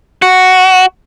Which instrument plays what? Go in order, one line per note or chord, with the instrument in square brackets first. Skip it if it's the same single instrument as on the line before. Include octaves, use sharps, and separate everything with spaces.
[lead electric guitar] F#4